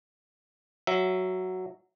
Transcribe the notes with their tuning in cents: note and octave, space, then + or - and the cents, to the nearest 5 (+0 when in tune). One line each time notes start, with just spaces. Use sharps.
F#3 +0 E5 +5